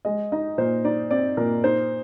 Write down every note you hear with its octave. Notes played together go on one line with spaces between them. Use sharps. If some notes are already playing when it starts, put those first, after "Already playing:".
G#3 D#5
D#4 D#5
A#2 C5
D#4 D5
C4 D5
A#2 A#4
D#4 C5